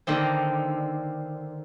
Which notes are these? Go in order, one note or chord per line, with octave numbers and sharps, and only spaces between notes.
D3 D#3 A#3 C4